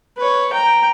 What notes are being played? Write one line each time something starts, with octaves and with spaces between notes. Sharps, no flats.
B4 C#5
G5 A#5